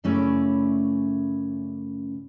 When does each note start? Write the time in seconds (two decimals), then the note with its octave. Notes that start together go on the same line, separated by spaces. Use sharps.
0.04 F#2 C#3 A3 C#4 E4 D5